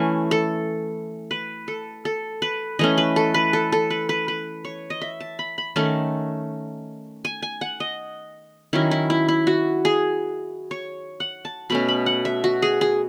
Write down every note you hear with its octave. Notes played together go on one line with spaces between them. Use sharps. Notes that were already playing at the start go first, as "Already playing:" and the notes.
Already playing: E3 A3 C#4 G#5
A4
B4
A4
A4
B4
E3 A3 C#4 D#5
B4
A4
B4
A4
A4
B4
B4
B4
C#5
D#5
E5
A5
B5
B5
D#3 A3 C#4 A5
G#5
G#5
F#5
D#5
D#3 F#3 C#4 E4
E4
E4
E4
F#4
G#4
C#5
F#5
A5
B2 A3 C#4 B5
B5
F#5
E5
F#4
G#4
G#4